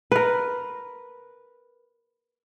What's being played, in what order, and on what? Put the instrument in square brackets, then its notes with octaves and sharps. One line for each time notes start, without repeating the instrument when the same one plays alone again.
[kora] A#4 B4